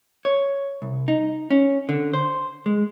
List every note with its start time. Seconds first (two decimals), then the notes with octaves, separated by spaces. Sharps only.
0.25 C#5
0.82 C2
1.08 D#4
1.50 C#4
1.89 D3
2.13 C5
2.66 G#3